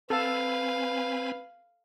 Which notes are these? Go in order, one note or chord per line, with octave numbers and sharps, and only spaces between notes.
C4 A4 B4 F5 G#5 B5